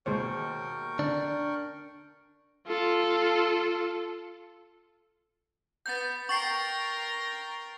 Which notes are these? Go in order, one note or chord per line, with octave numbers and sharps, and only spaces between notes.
D#2 B2 G#3 A#4 C5 C#5 G5 C#6
D3 D4
F4 A4
B3 G6 A6
A#4 G5 C#6 A6 C7